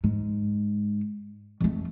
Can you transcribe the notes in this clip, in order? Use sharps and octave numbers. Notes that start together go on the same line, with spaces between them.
G#2
F2 A3